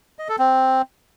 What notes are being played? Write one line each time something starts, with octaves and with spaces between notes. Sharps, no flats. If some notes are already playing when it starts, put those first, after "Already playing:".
D#5
A4
C4